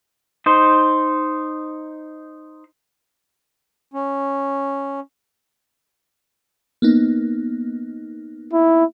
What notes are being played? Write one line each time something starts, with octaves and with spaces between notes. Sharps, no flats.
D#4 C5
C#4
A#3 B3 D#4
E4